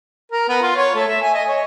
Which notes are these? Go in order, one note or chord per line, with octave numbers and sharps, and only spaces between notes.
A#4
B3
F4
C#5
A3
E5
G#5
D#5
C#5